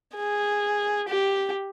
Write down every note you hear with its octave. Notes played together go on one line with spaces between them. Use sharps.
G#4
G4